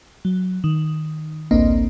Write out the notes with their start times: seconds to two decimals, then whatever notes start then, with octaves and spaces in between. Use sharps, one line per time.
0.25 F#3
0.64 D#3
1.51 A1 D2 A#3 C4 D4 D#5